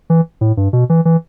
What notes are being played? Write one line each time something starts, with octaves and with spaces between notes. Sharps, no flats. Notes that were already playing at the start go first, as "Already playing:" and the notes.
E3
A2
G2
B2
E3
E3